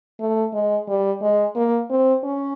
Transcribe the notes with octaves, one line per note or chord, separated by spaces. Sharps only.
A3
G#3
G3
G#3
A#3
C4
C#4